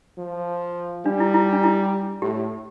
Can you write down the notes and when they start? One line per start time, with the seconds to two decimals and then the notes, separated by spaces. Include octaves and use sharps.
0.18 F3
1.05 G3 D4
1.20 E4
1.34 E4
1.53 D4
1.64 E4
2.22 A2 G4